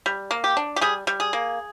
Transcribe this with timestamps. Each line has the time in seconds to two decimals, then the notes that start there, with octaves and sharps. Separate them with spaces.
0.06 G3
0.31 A#3
0.44 G4
0.57 D4
0.76 G4
0.81 G3 G#4
1.07 G3
1.20 G#4
1.33 A#3